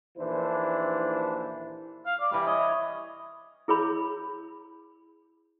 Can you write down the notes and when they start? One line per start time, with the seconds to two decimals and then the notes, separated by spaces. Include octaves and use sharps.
0.18 A#1 D#2 E3 D4 E4 C5
2.06 F5
2.20 D5
2.32 E3 G3 B4 D6
2.47 C#5 D#5
3.68 E4 G#4 C#5 B5